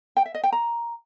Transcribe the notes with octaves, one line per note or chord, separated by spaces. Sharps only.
G5
E5
D#5
G5
A#5